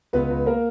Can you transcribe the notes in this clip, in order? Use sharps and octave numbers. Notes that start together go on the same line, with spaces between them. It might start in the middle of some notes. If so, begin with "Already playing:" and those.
C#2 B3 B4
C#2
A#3 A#4